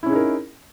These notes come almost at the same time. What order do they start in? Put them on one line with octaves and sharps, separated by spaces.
E4 C#4 G#4 D#4 A#4